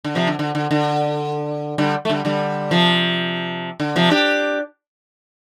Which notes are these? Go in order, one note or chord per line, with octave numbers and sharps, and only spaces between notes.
D3
C3 F3
D3
D3
D3
D3
D3 G3
A3
D3 G3
D3 G3
C3 F3
D3
C3 F3
D4 G4